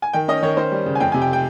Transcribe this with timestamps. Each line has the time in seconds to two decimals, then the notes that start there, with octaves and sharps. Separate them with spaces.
0.02 G#5
0.13 D#3 G5
0.28 C#4 D#5
0.42 D#3 C#5
0.57 C#4 C5
0.72 G3
0.86 C#3
0.95 G#5
1.00 F2 G5
1.12 C3 G#5
1.22 G5
1.33 G5